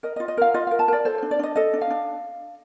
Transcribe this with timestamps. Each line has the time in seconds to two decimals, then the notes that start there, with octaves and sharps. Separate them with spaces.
0.03 A#4 D#5
0.16 D#5
0.20 F4
0.28 D#5
0.37 A#4 F5
0.54 F4 D#5
0.67 A#4 F5
0.79 A5
0.88 A#4 D5
1.05 A4 C5
1.18 D4 C5
1.31 D5
1.39 D4 D#5
1.56 A4 D#5
1.73 D4
1.81 F5
1.90 D4